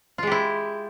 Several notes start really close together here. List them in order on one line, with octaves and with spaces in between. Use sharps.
F4 G#3 G4 E4